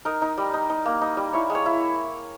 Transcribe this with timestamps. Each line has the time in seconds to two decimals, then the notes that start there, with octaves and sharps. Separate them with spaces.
0.05 D#4 A#4
0.22 D#4
0.38 G3
0.54 D#4
0.70 D#4
0.86 A#3
1.01 D#4
1.17 G3
1.33 E4 C#5
1.50 G#3
1.55 C#5
1.66 E4